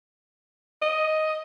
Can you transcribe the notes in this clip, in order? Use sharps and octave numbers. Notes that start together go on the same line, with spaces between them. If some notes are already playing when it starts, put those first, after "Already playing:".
D#5